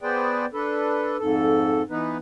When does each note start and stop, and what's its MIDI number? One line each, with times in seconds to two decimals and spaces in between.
0.02 0.46 59
0.02 0.46 68
0.02 0.46 71
0.02 0.46 72
0.02 0.46 74
0.02 0.46 79
0.53 1.17 62
0.53 1.17 69
0.53 1.17 71
1.19 1.82 41
1.19 1.82 44
1.19 1.82 69
1.90 2.17 52
1.90 2.17 59
1.90 2.17 63
1.90 2.17 71